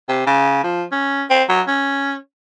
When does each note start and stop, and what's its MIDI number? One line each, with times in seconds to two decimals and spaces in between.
0.09 0.23 48
0.27 0.63 49
0.64 0.84 53
0.92 1.24 61
1.30 1.44 60
1.49 1.62 54
1.67 2.15 61